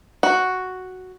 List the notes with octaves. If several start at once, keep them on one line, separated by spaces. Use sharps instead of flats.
F#4